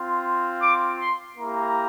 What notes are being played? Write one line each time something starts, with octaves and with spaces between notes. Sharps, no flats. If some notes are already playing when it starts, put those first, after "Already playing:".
Already playing: C4 F4
D6
C6
A#3 E4 G4 A#5